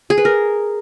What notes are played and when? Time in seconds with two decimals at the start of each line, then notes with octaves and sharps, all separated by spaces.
0.10 G#4
0.18 B4
0.25 A#4